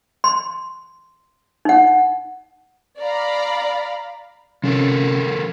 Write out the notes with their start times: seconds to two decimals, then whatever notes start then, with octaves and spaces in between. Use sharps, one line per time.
0.24 C6
1.65 D#4 F#5
3.00 D5 F5 A#5 B5
4.64 C3 F3 C#4 A4 A#4